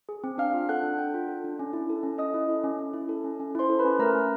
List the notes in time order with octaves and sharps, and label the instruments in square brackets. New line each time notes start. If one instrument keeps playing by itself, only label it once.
[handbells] G#4
C4
D4 F5 F6
F4
A4 F#5 F#6
D4
D4 G5 G6
F4
A4
D4
C#4
E4
A4
C#4
C#4 D#5 D#6
E4
A4
C#4
C#4
E4
A4
C#4
C#4
E4 C5 C6
A4
B4 B5
C#4
A3 A#4 A#5
C#4